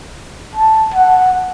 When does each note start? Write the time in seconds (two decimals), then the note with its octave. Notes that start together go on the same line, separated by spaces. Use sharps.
0.56 A5
0.94 F#5